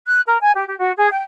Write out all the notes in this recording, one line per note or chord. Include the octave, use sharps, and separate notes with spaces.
F#6
A#4
G#5
G4
G4
F#4
G#4
G5